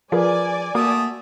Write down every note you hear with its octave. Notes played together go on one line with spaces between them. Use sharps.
F3 G#4 A#4 B4 D5 G#5
A3 A#3 F#4 D#6